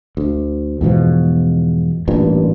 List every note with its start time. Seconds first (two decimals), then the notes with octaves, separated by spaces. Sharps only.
0.17 D2
0.81 E2 G#2 B2 F3
2.08 A1 G2 A#2